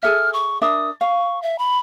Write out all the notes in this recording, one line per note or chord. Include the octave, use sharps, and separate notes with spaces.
G#4 A4 E5 F6
C#6
D4 A#4 E5 D#6
F5 C#6
E5
B5